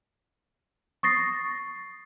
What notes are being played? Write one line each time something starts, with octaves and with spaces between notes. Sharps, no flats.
C#6 D#6 A6 A#6 C7